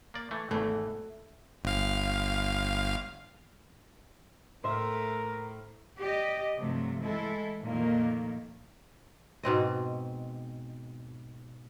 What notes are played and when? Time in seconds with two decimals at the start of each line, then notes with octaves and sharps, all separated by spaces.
0.14 A#3 D5
0.31 E3 A3
0.51 G#1 E2 E3 A3
1.64 G1 F5
4.64 A2 A3 A#4 C5 E5
6.00 G4 D5 D#5
6.58 G2 C3 F3 F#3 A3
7.00 E3 G#3 A3 E4 A4
7.64 F2 A#2 D#3 A3 A#3
9.43 G#2 B2 C4 D#5